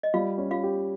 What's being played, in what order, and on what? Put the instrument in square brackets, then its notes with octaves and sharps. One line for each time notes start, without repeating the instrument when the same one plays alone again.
[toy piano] D#5
[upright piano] G3 [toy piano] F4 F5
[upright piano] C#4
[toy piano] F4 F5
[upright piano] G4